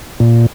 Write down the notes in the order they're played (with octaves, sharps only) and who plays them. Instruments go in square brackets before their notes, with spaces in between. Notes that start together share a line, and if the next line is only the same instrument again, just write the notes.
[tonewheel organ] A#2